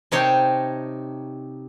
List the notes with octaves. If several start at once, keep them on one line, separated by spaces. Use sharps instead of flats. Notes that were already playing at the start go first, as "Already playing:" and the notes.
C3 D#4 C#5 G5 A5 C6